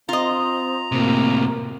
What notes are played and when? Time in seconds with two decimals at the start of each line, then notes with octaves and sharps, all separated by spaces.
0.09 C4 F4 D#5 A#5
0.92 A2 C3 A#3